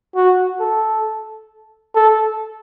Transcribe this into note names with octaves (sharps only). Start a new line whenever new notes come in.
F#4
A4
A4